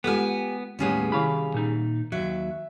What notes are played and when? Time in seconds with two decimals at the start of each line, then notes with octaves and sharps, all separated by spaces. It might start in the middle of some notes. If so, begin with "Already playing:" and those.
0.04 G#3 B3 F4 G4 A4 G5 G#5
0.79 D#2 A2 G3 B3 C#4 G#4
1.12 C2 D#3 E4 F5 B5
1.54 A#2 D#4
2.12 D#2 F#3 E5